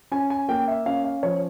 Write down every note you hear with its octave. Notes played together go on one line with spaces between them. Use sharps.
C#4 G#5
G#5
A#3 G5
E5
C#4 F5
F5
F3 C#5